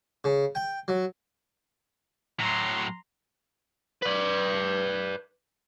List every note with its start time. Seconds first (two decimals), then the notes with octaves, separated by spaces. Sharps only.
0.24 C#3
0.55 G5
0.88 F#3
2.40 A2 F#3 A#5 C6
4.03 B4 D5